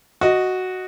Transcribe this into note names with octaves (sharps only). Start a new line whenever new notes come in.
F#4 D#5